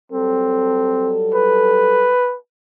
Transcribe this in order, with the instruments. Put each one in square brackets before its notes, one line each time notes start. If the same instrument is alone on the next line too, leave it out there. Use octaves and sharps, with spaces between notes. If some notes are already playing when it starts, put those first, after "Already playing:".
[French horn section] F#3 G3 A4 [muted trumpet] C4
[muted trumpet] B4